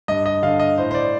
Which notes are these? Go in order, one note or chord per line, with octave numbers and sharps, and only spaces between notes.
G2 D#5
D#5
D3 F5
D#5
A2 C5
C5
D5